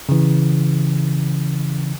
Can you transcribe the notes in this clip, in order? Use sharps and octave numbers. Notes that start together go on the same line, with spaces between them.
C#3 E3